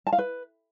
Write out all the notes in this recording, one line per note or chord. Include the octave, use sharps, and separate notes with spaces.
A5
F5
B4